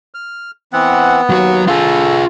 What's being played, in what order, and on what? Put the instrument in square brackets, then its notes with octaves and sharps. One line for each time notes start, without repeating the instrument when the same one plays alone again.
[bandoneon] F6
[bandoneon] E3 C4 F#5 [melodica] B3
[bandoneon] D#2 [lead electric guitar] F#3 F#4
[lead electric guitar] F4 G#4 [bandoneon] A4